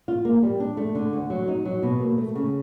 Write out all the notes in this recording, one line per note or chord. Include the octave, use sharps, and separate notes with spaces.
F4
A#3
G3
D4
A3
D3
D2
F#3
D#4
F#3
B2
A#3
A3
C#3